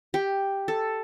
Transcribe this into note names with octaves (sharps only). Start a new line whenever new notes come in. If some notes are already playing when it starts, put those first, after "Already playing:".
G4
A4